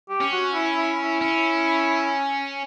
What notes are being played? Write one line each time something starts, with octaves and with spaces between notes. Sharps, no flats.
G4
C#4
F#4
E4
E4
E4
C#4